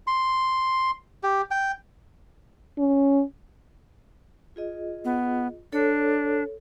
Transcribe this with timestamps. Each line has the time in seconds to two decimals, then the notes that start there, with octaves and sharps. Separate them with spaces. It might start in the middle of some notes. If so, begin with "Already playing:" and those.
0.07 C6
1.23 G4
1.51 G5
2.78 C#4
4.56 F4 G#4 D#5
5.05 B3
5.73 D4 A4 C#5